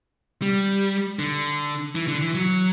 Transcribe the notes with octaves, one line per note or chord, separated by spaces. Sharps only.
G3
D3
E3
D3
E3
F#3